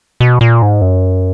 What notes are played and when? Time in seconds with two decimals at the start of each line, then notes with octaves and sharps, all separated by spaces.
0.20 B2
0.41 A#2
0.62 G#2
0.82 F#2